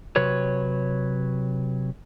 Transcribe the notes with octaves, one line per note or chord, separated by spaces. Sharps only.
C3 F#3 B4 C#5